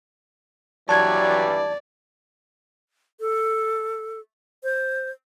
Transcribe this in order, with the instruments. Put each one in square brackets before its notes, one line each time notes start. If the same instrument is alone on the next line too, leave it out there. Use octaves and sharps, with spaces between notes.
[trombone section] G2 E3 G3 [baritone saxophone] F#3 [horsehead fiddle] D5 [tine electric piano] A5 G#6
[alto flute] A4
C5